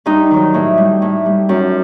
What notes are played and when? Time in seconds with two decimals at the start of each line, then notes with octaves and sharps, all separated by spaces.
0.06 G2 D#4
0.31 D#3 F#3
0.54 A2
0.77 G3
1.02 A2
1.26 G3
1.49 F#2